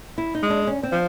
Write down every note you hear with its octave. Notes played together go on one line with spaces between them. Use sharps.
E4
D#4
G#3
D4
C#4
C4
F3